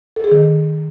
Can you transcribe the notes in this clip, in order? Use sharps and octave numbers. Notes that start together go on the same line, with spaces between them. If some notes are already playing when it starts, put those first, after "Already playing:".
A4
G#4
D#3